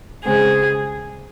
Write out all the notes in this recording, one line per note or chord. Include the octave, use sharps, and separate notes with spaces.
C#3 G#3 C4 G#4